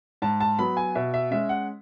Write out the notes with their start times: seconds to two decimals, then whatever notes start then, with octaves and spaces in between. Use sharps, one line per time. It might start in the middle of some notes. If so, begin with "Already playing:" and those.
0.22 G#2 A5
0.40 A5
0.59 F#3 B3 B5
0.77 G#5
0.95 B2 E5
1.14 E5
1.31 G#3 C#4 E5
1.49 F#5